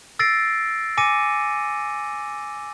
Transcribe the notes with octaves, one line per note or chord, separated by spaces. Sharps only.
E6 A6 A#6 C7 D7
G#5 D6 A#6 C#7 D#7